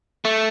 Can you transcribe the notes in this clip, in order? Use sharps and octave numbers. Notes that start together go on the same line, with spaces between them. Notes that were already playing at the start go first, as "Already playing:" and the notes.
A3